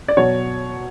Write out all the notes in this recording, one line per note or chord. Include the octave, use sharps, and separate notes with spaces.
D5
B2 F#3 C#5